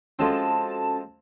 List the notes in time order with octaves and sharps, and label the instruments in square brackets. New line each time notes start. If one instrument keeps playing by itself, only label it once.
[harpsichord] F3 G#3 C4 [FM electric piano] C#4 F#4 A4 [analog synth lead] A5